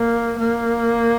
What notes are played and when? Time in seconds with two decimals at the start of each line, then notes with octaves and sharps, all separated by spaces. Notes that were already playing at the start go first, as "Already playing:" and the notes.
Already playing: A#3
0.39 A#3